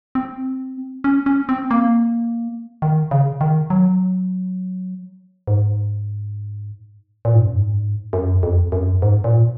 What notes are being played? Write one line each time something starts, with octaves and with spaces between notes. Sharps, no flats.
C4
C#4
C#4
C4
A#3
D#3
C#3
D#3
F#3
G#2
A#2
G#2
F#2
G#2
F#2
F2
F#2
G#2
A#2